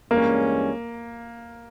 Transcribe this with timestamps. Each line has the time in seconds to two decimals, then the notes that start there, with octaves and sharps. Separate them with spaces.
0.10 G2 E3 G#3 A#3 C#4